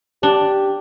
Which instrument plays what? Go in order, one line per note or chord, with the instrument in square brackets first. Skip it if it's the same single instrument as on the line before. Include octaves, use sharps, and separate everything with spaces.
[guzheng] D4 [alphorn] G4